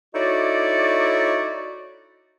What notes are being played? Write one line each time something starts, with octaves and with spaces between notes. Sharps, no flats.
D#4 E4 F#4 A4 C#5 D5